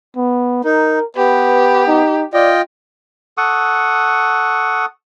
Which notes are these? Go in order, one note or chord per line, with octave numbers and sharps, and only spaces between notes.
B3
D#4 A#4
B3 G4 B4
D#4
F4 D5 D#5 G5
A4 F#5 C#6 D#6